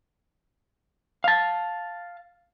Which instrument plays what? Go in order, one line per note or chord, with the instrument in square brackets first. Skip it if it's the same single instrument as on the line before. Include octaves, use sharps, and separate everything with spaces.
[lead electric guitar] F5 A5